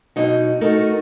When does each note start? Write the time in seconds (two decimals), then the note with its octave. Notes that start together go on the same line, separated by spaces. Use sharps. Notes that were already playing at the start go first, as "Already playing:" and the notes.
0.16 B2 F#3 D#4 F#4
0.61 A3 D#4 F#4 A4 A#4